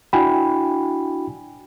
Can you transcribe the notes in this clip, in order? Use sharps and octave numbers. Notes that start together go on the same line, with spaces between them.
D4 E4 F#4 G5 G#5 B5